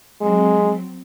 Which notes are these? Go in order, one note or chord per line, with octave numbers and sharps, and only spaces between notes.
F#3 G#3 C4